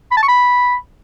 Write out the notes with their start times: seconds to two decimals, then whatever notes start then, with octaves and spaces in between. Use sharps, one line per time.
0.11 B5
0.17 A5
0.23 C#6
0.28 B5